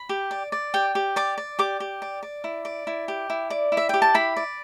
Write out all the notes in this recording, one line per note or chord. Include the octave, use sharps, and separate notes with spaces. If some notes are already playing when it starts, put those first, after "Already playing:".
Already playing: B5
G4
D5
D5
G4 G5
G4
D5 D6
D5
G4 D6
G4
D5
D5
E4
D5
E4
G4
E4
D5
E4
E5
G4 G5
A5
E4 B5
D5